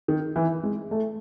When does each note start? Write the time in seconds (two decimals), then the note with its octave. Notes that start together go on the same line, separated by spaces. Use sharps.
0.08 D#3
0.36 E3
0.64 G#3
0.91 A3